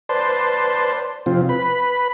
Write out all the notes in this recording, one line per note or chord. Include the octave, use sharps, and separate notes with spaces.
B4 C5 D5 A5 C6
C3 F3 C4 F4
B4 B5